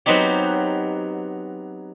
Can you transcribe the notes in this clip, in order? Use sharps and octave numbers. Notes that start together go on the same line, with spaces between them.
F#3 B3 C4 D#4 G4